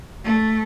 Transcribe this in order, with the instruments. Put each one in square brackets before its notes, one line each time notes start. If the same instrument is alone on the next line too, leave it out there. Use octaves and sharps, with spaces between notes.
[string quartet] A3